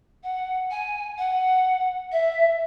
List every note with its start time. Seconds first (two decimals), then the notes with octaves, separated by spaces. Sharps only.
0.23 F#5
0.71 G#5
1.18 F#5
2.12 E5